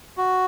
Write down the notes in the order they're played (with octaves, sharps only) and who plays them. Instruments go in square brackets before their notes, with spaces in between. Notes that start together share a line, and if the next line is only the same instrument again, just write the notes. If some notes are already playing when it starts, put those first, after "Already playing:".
[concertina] F#4